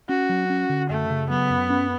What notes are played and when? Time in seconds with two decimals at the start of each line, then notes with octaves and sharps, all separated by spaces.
0.09 C#4 F#4
0.29 F#3
0.50 C#4
0.69 D3
0.90 F#2 A3
1.10 C#3
1.30 F#3 B3
1.50 F#2
1.70 C#4